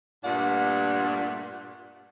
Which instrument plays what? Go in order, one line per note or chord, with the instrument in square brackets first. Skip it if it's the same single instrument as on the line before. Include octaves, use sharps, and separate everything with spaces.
[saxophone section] G2 A#2 A3 D4 D5 F#5